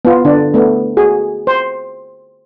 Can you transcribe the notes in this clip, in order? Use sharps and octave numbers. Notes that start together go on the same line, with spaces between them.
B3 F4
D3 D4
A3 B3
F#4 G#4
C5